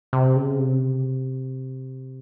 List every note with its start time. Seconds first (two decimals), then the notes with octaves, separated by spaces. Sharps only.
0.13 C3
0.36 C#3
0.59 C3